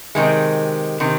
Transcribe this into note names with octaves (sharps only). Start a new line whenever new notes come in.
C3 D#3 G#3
C3 D#3